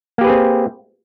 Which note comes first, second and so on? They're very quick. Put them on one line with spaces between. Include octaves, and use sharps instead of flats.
A#3 G4 B4 G#4 C4